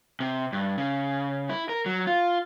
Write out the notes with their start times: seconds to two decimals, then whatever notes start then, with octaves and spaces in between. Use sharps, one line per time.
0.20 C3
0.53 G2
0.78 C#3
1.49 E4
1.69 A#4
1.86 F#3
2.07 F4